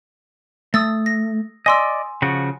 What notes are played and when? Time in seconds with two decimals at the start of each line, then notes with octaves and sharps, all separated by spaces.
0.74 A3 D#6 E6 A6
1.06 A#6
1.66 D5 D#5 G#5 C6 E6
2.22 C#3 F3 F#4